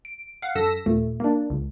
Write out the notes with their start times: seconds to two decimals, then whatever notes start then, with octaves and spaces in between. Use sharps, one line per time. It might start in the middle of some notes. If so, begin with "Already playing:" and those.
0.05 D7
0.42 F5 F#5
0.55 F#2 A4 E6 A#6 B6
0.86 D#2 A#2 A3
1.20 A#3 D4
1.50 C#2